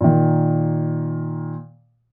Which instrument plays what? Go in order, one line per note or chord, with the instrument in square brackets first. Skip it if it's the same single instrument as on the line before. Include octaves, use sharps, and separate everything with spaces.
[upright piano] A#2 D#3